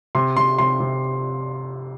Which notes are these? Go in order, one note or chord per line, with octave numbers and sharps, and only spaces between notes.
C3 C6
C3 C6
C3 C6
C3